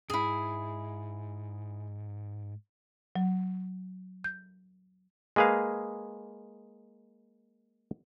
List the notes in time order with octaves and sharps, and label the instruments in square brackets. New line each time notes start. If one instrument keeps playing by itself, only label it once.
[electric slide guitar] F2 G#2 [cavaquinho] E4 G#4
[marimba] F#3
G6
[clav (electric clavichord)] G#3 A#3 G#4 B4 F5